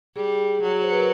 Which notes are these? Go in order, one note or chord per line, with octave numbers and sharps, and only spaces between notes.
G3 G#4
F#3
C5
B4
A#4